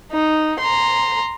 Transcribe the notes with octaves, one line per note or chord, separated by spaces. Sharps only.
D#4
A#5 C6